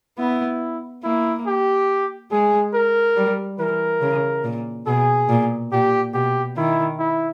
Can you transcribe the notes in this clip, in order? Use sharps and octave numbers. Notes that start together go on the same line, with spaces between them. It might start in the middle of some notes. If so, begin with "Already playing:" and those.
B3 E4
A#3 E4
G4
G#3 G#4
A#4
G3
E3 A#4
C#3
A#2
B2 G#4
A#2
A#2 G4
B2 G4
D#3 E4
E4